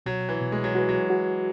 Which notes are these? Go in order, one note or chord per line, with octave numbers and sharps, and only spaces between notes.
B2 F#3
E3
B2
G#3
F#3
E3 F#4
F#3
F#4